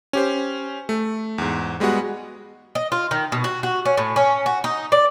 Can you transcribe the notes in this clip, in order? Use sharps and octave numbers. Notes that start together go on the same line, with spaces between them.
C#4 G4 C5
A3
E2 G#2
G3 G#3 B3 F#4 F#5
D#5
F4
D#3
B2
F#4
F#4
C#4
A2
C#4
F#4
D#4
D5